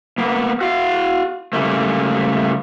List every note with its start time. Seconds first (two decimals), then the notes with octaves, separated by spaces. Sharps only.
0.18 A#3 B3
0.61 F#4 F5
1.53 C#3 G3 A3 A#3